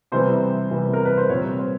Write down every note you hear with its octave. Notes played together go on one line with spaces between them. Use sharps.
C3 E3 G3 B3 C5
C3 E3 G3 B3
A#4
B4
C5
A#2 G3 C4 C#5
C5